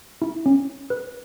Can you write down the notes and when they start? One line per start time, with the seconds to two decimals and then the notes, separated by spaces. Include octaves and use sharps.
0.22 E4
0.46 C#4
0.90 B4